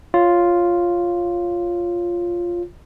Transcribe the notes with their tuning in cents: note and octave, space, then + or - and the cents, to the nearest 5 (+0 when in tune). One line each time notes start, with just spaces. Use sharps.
F4 +0 C#5 +0